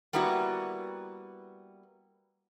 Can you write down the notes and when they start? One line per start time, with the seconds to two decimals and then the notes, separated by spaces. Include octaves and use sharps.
0.13 G3 A#3 B3 E4 F#4